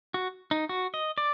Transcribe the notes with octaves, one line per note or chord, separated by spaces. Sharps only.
F#4
D#4
F#4
D#5
D5